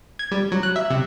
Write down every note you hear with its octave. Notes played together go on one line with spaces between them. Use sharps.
G#6
G3
F#3
F#6
E5
C3